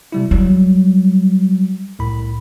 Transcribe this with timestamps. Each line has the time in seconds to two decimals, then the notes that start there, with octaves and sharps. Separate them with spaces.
0.12 C3 G3 E4
0.31 F#3 G3
1.99 C2 A2 B5